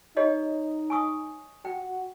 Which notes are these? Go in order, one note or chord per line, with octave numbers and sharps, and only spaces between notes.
D#4 G4 C#5 D#5
G#5 C#6 D#6
F#4 G5